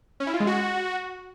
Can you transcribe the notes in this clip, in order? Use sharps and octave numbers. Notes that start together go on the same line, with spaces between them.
C#4
E4
F4
G#3
F#4